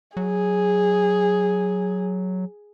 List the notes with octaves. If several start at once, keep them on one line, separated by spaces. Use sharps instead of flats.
F#3 G#4